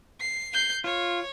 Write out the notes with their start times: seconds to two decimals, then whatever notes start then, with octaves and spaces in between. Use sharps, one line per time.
0.20 C7
0.53 G6 C7
0.84 F4 C#5